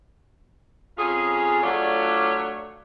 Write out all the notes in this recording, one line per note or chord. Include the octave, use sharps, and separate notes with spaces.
F2 C#4 F4 G#4
F#3 A3 D4 F4 C#5 D5